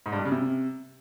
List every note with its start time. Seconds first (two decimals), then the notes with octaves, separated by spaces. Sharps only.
0.06 G#2
0.12 G2
0.19 G3
0.25 C#3
0.32 C3